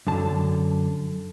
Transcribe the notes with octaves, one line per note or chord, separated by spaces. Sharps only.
F#2 D3 A5